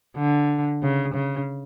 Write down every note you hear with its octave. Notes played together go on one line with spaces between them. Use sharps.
D3
C#3
C#3